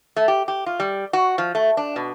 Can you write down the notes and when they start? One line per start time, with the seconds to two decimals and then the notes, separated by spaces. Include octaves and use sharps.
0.16 A3
0.28 G4
0.48 G4
0.66 F4
0.80 G3
1.13 F#4
1.38 F3
1.55 A3
1.77 D4
1.96 B2